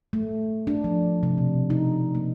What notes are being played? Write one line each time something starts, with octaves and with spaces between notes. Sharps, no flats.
A3
D4
F3
C3
B2
D#4
A#3